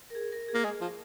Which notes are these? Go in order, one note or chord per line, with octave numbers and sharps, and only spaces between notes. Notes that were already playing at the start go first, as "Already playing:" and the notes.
A#4
G#4
A#4
G#4
A#3
G#3 G#4
F3